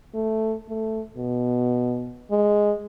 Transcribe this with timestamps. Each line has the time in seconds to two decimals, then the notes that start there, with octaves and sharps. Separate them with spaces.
0.14 A3
0.69 A3
1.17 B2
2.31 G#3